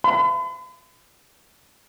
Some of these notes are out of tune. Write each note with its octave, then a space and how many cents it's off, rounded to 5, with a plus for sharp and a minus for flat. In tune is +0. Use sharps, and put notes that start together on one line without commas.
B5 +45